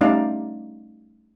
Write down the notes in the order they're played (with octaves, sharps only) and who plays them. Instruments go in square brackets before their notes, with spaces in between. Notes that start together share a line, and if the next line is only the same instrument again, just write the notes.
[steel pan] G3 A3 C#4 D#4 D5 F5